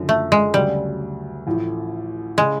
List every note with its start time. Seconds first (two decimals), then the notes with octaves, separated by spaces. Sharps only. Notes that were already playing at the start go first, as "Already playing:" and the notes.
Already playing: F#1 F#2 D3 F3
0.09 A3
0.32 G#3
0.54 D2 C#3 F#3 G3
1.47 A1 A2 F3
2.38 C#3 G#3